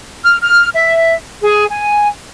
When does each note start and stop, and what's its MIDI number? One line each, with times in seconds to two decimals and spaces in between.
0.24 0.37 89
0.42 0.68 89
0.75 1.15 76
1.41 1.64 68
1.70 2.08 80